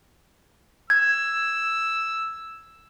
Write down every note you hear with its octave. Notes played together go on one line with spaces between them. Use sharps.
E6 G#6